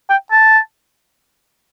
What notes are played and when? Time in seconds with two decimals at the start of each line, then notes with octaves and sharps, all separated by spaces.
0.10 G5
0.32 A5